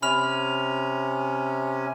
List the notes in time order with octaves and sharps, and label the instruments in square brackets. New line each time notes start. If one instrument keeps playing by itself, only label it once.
[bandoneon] C3 C#4 [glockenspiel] B5 F6 F7